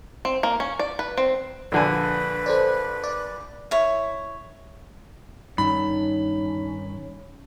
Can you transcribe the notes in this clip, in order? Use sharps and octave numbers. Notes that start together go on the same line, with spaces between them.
C4
A#3
C#4
D5
B4
C4
A#1 D3 B4 G#5
A4 C5 D5
D5
E4 C#5
G2 D#3 C#4 D#4 B5